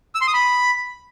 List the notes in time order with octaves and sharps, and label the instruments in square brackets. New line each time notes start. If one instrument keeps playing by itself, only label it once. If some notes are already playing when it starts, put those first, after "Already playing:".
[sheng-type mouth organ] E6
C6
D#6
B5